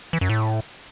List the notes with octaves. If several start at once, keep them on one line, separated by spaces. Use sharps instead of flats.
E3
F#2
A2